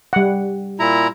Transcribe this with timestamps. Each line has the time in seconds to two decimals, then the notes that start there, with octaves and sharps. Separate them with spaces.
0.13 G3 F#5
0.80 A#2 E4 A#5